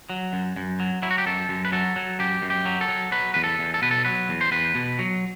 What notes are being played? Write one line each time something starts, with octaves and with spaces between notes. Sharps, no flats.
F#3
F#2
F#2
F#3
F#3 E4
F#4
G4
F#2 A4
F#2
B4
F#3 A4
F#3
F#2 G4
F#2
G4
F#3
A4
F#3
F#3 B4
E2 B4
A4
E2
A4
B2 B4
A4
F#3 B4
E2
C5
E2 B4
B2
F#3